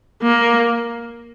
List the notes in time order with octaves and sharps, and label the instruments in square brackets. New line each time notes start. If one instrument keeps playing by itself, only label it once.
[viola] A#3